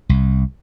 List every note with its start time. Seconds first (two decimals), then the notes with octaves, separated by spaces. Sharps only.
0.09 C2